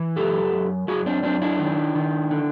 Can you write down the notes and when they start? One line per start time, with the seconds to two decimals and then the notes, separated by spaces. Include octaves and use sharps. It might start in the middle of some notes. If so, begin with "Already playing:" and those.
Already playing: E3
0.16 F#2 G4 A4
0.53 F#2
0.87 F#2 F#4 G#4
1.06 C4 D4
1.23 F#2 C4 D4
1.42 D4 E4
1.59 D#3
1.95 D#3
2.31 D3